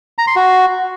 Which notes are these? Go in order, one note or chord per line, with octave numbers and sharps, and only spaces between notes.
A#5
C6
F#4